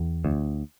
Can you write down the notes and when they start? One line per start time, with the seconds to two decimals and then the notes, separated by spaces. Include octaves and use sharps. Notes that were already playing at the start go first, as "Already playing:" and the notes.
Already playing: E2
0.25 D2